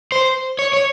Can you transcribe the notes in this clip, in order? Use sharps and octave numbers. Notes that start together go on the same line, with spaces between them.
C5
C#5
C#5